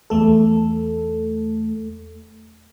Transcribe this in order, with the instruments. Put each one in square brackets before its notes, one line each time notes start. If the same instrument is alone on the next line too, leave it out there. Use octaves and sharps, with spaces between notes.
[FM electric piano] E2 A3 A4